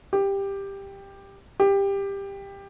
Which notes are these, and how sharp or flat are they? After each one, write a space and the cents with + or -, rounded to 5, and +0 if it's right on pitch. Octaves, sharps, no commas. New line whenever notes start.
G4 +10
G4 +15